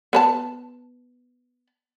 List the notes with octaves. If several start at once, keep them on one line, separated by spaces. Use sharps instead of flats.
B3 B4 A5